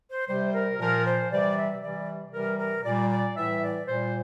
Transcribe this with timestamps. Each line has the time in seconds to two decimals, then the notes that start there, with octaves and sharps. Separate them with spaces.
0.10 C5
0.28 C3 G3 C5
0.53 A#4
0.79 A#2 F3 A#4
1.04 C5
1.30 C3 E3 G3 D5
1.56 E5
1.81 C3 E3 G3 D5
2.33 C3 E3 G3 A#4
2.59 A#4
2.84 A#2 G3 D5
3.10 D5
3.35 A2 E3 G3 E5
3.62 D5
3.87 A#2 G3 C5